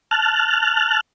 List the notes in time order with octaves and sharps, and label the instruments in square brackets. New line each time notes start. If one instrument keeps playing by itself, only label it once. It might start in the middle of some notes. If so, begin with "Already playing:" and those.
[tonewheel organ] A5 F6 F#6